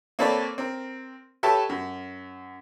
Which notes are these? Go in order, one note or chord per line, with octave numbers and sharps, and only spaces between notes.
A#3 C4 A4 B4 C#5 D5
C4 A#4
G4 A4 B4 C#5 E5 A5
F#2